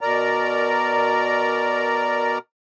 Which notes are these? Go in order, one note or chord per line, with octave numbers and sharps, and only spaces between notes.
B2 A#4 D5 A#5